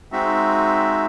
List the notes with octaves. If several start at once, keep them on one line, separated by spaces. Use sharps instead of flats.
G#3 C4 D#4 F#4 E5